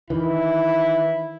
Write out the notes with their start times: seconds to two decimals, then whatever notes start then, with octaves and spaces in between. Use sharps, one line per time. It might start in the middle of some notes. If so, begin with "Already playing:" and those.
0.10 D#3 E3 E4